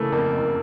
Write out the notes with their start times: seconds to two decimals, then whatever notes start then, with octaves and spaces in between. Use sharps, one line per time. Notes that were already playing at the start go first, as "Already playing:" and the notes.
Already playing: C#3 E3 A3 A#3
0.12 F2 A#3
0.34 F#1